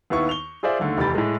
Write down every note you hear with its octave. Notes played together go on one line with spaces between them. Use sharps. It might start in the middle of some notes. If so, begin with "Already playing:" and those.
D#2 B3 E4 C#6
C#6 F7 G7
F4 G#4 C5 D5 E5
D#2 D3 A3
F1 E2 G4 B5 A6
A2 G#3